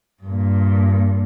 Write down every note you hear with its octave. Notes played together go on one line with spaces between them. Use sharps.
G2 A#2